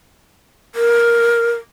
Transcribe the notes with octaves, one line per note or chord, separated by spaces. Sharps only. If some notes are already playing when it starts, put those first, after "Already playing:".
A#4